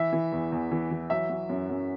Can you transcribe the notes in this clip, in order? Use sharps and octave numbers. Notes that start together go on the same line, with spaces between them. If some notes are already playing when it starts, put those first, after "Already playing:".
Already playing: E3 E5
E3
E2
E2
E3
E3
F#3 E5
F#3
F#2
F#2